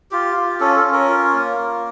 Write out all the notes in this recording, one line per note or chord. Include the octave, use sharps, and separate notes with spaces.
F4 G4
F4
C#4 A4
A4
C#4
A#4
F4
A#3
A#3